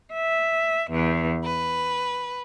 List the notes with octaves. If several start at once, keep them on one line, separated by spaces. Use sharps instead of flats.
E5
E2
B4